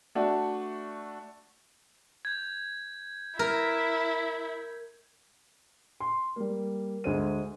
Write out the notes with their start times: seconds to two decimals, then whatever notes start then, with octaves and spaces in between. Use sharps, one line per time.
0.15 A3 D4 F#4
2.25 G6 G#6
3.39 E4 A#4
6.00 C6
6.36 G3 A#3
7.04 D2 G#3 C5 D#7